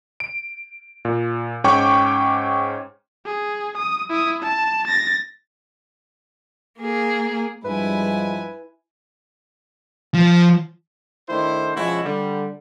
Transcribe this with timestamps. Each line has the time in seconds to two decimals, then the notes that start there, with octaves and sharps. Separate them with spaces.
0.20 D7
1.05 A#2
1.64 G#2 C#4 G5 C#6 D6
3.26 G#4
3.78 D#6
4.10 E4 D#6
4.43 A5
4.88 A6 A#6
6.80 A#3 G#4
7.65 G2 F3 G#3 E4 B4 G#5
10.14 F3
11.29 D#3 A3 D4 E4 C5
11.75 B2 F3 G#3 C#4 E4 F#4
12.05 D3 G3